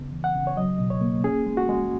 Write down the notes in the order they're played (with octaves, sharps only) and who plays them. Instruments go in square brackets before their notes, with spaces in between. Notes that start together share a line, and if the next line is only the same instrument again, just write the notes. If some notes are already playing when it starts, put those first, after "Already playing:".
Already playing: [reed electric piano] C#3 B3
E3
F#5
C#3
C#5
F#3 D#5
B2
C#5
A#3
C#4 G#4
G#3
F#4
G#3